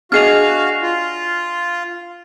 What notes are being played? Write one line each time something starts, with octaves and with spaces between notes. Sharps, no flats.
D4 F#4 G#4 D#5 F5 F6 C7 F7
F4